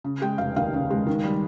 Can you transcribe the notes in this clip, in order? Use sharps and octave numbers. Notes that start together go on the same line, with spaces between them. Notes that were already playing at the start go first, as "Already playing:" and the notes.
C#3
G#3 G5
F1 F5
D#2 F5
C#3
G#3
D#3
G3